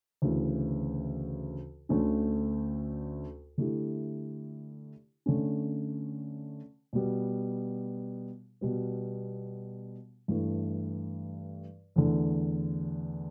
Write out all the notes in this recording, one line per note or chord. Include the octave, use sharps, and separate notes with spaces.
D2 C#3 E3
D2 D3 A3 C#4
D3 A3 E4 G4
D3 A3 C#4
B2 G3 B3
B2 G3 B3
G2 E3 A3
E2 D3 A3